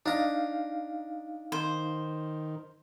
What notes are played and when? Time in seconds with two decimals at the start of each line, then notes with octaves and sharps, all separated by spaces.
0.06 D4 D#4 F5 A#5
1.52 D#3 C5